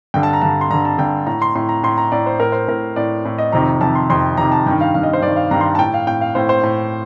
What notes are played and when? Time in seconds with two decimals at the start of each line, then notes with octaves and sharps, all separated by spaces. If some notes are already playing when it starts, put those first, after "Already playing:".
0.14 G2 D3 G5
0.23 A5
0.33 A#5
0.42 G2 D3 A5
0.61 C6
0.70 G2 D3 A#5
0.85 A5
0.98 G2 D3 G5
1.26 A2 A#5
1.42 C6
1.55 A2 C6
1.69 A#5
1.83 A2 C6
1.98 A#5
2.12 A2 D5
2.26 C5
2.40 A2 A#4
2.52 C5
2.68 A2 A#4
2.96 A2 D5
3.25 A2
3.38 D#5
3.52 F2 C3 D#3 A#5
3.81 F2 C3 D#3 A5
3.95 C6
4.10 F2 C3 D#3 C6
4.37 F2 C3 D#3 A#5
4.52 A5
4.66 G2 D#3 G5
4.81 F5
4.94 G2 D#3 F5
5.03 D#5
5.13 C5
5.22 G2 D#3 D5
5.36 F5
5.51 G2 D#3 A#5
5.61 C6
5.75 A5
5.79 A2 G5
5.94 F5
6.07 A2 G5
6.21 F5
6.35 A2 C5
6.49 C5
6.63 A2